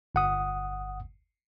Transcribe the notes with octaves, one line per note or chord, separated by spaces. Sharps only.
G1 F#5 D#6